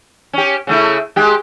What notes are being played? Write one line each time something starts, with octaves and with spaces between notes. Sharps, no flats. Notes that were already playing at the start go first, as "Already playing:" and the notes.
C#4 G4
C#3 A3 E4
G#3 G4